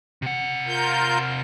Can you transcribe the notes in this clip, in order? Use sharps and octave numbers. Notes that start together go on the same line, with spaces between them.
C3 F#5
F4 A#4 G6